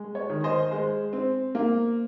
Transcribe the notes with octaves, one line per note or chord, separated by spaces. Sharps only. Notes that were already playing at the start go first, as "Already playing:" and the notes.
Already playing: G#3
C#5
D#3
C5 D#5
G#3 C5
C4
A#3